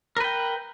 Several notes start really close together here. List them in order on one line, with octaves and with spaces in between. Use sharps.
A#4 B4 G5